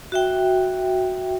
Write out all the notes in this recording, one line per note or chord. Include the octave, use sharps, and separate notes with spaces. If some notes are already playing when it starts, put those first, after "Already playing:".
F#4 E5 G5